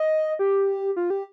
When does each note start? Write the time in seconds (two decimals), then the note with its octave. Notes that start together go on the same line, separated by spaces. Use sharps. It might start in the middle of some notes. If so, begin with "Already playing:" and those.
Already playing: D#5
0.39 G4
0.96 F4
1.10 G4